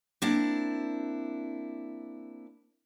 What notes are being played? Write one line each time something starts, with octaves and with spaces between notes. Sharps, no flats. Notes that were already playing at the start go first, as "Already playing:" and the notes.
A#3 C4 D4 E4